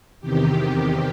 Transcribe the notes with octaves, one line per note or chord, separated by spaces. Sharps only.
E2 C3 D#3 G4
G4
G4